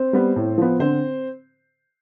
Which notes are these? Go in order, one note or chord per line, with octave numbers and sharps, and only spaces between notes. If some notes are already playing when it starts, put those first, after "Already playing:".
Already playing: C4 C5
G3 B3
A2
F3 B3
D3 C4 C5